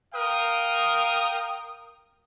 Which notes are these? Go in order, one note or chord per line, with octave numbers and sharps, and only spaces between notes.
A#4 F5 G5 D#6